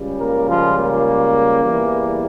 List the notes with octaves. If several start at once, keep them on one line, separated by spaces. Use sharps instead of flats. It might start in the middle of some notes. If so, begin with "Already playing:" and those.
Already playing: C#2 C#3 G3
A#3 A#4
F3 F4
A#3
E2 E3 G3